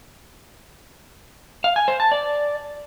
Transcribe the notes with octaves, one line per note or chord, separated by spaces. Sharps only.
F5
G#5
C5
A5
D5